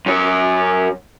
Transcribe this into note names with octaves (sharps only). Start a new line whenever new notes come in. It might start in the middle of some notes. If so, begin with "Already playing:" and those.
F#2 C#5